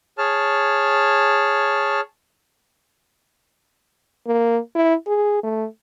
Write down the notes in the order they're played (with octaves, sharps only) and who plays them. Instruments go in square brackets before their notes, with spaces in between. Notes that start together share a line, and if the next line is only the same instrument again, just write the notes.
[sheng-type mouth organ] G#4 C#5 A5 F6
[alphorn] A#3
E4
G#4
A3